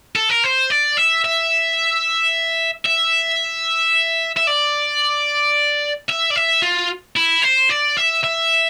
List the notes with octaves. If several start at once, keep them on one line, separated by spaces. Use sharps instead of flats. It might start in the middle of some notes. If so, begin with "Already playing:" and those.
A4
A#4
C5
D5
E5
E5
E5
E5
D5
E5
D5
E5
F4
E4
C5
D5
E5
E5